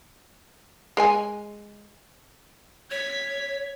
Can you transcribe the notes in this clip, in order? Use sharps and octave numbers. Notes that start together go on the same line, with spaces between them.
G#3 D#5 G#5
C#5 G#6 B6